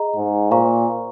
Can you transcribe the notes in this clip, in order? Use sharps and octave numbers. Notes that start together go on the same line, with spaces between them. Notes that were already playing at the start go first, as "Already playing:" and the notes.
Already playing: G#4 D#5 A#5
G#2
A#2 C5 F5 A#5 C#6